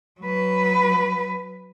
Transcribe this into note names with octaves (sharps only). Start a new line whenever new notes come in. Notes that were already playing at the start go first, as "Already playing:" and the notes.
F#3 B4